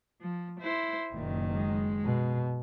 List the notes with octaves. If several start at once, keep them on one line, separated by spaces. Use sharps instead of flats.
F3
E4 C5
F#1 A#2 D#3
G#3
B2